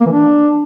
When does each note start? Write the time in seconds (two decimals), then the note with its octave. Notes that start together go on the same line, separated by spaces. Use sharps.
0.01 A#3
0.06 E3
0.12 D4